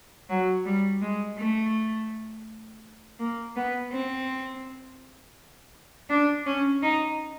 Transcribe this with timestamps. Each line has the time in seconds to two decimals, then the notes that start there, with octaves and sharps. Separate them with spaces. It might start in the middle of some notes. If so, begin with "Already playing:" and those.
0.29 F#3
0.65 G3
1.01 G#3
1.38 A3
3.19 A#3
3.56 B3
3.91 C4
6.10 D4
6.46 C#4
6.83 D#4